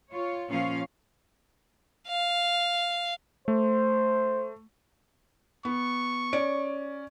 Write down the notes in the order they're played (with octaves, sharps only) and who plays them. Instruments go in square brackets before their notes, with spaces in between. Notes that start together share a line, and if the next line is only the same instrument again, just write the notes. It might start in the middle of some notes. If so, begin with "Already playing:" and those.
[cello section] F4 C#5
A#2 F3 C#4 F4 C#5 F5
[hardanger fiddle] F5
[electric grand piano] A3 [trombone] C5
[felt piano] B3 [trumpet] C#6
[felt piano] C#4 D5 D7